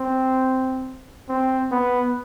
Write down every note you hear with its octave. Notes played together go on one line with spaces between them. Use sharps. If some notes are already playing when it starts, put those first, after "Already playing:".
Already playing: C4
C4
B3